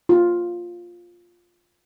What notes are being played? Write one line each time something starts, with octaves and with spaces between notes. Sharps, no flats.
F4